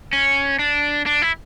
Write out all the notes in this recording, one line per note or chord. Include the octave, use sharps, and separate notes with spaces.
C#4
D4
D4
E4